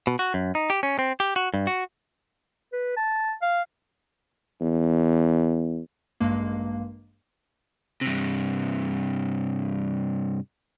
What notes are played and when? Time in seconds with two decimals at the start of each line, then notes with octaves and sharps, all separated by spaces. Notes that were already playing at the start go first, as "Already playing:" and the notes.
0.07 B2
0.19 F#4
0.34 F#2
0.55 D#4
0.70 G4
0.83 C#4
0.99 C4
1.20 G4
1.36 F#4
1.54 G2
1.67 F#4
2.73 B4
2.97 A5
3.42 F5
4.61 E2
6.20 A1 G2 G#3 A#3
8.01 G2 C3